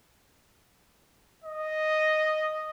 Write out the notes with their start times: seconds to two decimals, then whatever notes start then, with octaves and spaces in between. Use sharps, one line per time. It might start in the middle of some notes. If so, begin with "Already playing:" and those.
1.45 D#5